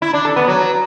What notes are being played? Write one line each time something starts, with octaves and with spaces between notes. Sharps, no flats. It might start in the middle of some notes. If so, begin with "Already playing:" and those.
E4
D4
A4
B3
F#3